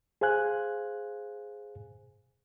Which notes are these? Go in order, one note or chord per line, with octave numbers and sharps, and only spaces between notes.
G#4 C5 F5 G#5 F#6